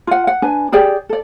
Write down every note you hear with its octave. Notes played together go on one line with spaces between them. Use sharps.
F4 F#5
F#5
D4 B4 G#5
G4 G#4 D5 G5
A4 D5